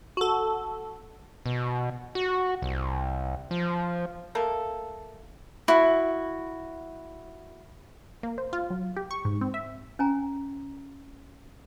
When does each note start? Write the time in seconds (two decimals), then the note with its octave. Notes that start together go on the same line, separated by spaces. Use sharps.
0.17 F#4 A4
1.46 B2
2.15 F#4
2.62 C2
3.51 F3
4.35 A3 A#3 A4
5.68 E4 F#4
8.23 A#3
8.38 C5
8.53 F4
8.70 F#3
8.97 G4
9.11 C#6
9.25 G#2
9.41 C4
9.54 E5
9.99 C#4 G#5 A#5